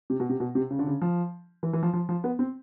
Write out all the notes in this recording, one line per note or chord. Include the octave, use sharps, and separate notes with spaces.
C3
B2
C3
B2
C3
C#3
D3
C#3
F3
E3
E3
F3
F3
F3
B3
C4